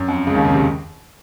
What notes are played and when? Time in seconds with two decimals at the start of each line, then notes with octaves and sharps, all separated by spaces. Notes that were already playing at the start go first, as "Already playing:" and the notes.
Already playing: F#2
0.08 F2
0.27 C#2 C#3
0.35 D#2 D#3
0.45 C#3
0.53 C3